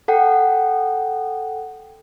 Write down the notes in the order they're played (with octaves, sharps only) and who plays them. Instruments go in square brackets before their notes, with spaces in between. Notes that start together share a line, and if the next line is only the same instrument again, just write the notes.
[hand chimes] A4 F#5 G5